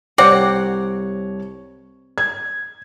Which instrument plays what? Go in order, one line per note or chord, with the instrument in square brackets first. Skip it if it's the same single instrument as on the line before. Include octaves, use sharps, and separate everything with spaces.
[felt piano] C2 C#5 [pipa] C4 D5 F#5
[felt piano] G#6